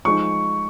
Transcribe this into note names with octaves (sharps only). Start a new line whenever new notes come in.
F3 G#3 D#4 C#6